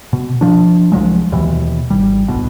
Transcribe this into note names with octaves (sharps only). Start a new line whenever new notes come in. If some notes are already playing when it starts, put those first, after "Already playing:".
B2
F3 D4
C2 F3 F#3 G#3
D#2 B2 E3
G#1 G3
D1 B1 B2